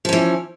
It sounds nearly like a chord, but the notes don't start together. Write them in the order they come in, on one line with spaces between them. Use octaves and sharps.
F3 C#4 E3